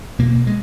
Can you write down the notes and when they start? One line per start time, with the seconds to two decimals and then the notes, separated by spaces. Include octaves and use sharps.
0.19 B2 A#3
0.47 G#3